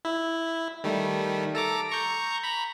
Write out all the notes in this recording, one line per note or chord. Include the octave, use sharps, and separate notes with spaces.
E4
D#3 G3 A3
A4 A#5 D6
A#5 C#6 G6
A#5 B5